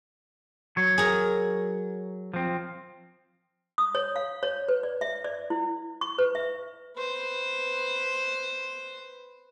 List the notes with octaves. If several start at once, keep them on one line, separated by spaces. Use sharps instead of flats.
F#3 C#5
G#4 A#4
F3 C4
D#6
C#5
F5
C#5
B4
D5
E5
D5
E4
C#6
B4
E5
B4 C5